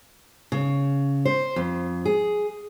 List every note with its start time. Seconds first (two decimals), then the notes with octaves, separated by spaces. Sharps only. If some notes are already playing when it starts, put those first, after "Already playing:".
0.52 C#3
1.25 C5
1.56 F2
2.06 G#4